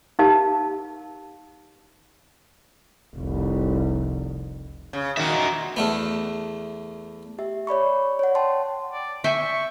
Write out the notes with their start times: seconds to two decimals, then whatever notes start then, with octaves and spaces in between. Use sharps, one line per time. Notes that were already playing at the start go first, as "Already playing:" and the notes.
0.19 D#4 G4 A#4 F5 A5
3.17 F1 C2
4.93 C#3
5.17 A#2 D#3 F#4 E5
5.76 E2 A3 B3
7.39 G4 E5
7.67 C#5 D5 B5 C#6
8.19 C#5 F#5
8.35 G5 A5 C6
8.93 D5
9.24 E5 G5 G#5 C#6